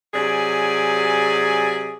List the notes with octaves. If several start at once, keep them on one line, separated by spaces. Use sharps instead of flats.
C3 F#3 G#4 D5 G#5